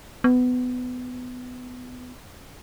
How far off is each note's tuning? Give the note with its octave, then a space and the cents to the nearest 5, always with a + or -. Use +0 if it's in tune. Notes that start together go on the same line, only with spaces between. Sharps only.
B3 +20